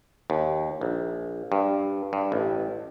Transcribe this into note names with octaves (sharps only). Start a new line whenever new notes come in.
D#2
A#1
G2
G2
A1